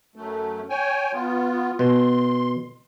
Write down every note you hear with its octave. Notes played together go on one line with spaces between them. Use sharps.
F#2 A3
C#5 G5 G#5
B3 F4
B2 C6